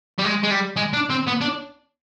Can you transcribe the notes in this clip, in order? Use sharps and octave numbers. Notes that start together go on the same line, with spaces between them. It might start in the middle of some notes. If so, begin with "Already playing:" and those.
G3
G#3
G#3
G3
G#3
D4
C4
B3
D4